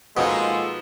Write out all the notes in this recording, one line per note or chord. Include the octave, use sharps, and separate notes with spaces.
B2 F3 G#3 A#3 D#4 F4 A4